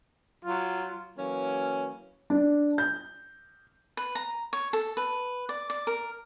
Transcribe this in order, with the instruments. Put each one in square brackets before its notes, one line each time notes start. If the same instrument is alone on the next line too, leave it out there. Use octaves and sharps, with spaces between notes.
[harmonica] F#3 [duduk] F4
[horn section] E3 F#3 A#3 C#4
[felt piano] D4
G6
[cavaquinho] B4
A#5
C#5
A4
B4
D5
D5
A#4